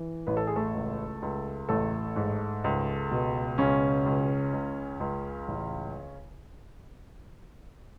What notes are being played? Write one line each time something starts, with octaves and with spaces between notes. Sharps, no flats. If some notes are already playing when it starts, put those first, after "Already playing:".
Already playing: E3
A1 B4
A4
G#4
A3 A4
C#2
C#2
A1 A3 A4
G#2
C#2
B2
C#2 C#3 C#4
C#2
C#2
C#2
A1